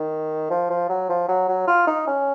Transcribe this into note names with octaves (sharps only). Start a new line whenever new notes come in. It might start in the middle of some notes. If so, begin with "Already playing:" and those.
Already playing: D#3
F3
F3
F#3
F3
F#3
F#3
F4
D#4
C#4